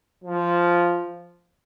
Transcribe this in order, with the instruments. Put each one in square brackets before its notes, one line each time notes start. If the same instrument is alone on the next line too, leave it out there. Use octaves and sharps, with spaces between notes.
[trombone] F3